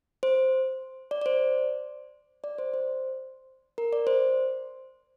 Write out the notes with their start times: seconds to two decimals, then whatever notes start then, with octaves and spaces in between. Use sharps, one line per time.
0.23 C5
1.11 D5
1.22 D5
1.26 C5
2.44 D5
2.58 C5
2.74 C5
3.78 A#4
3.93 D5
4.07 C5